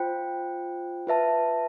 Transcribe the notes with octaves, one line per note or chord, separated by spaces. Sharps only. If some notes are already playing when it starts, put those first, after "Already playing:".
Already playing: F4 C5 G5
F4 B4 E5 A5